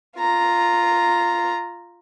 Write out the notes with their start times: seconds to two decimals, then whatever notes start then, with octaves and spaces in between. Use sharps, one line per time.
0.18 F4 A#5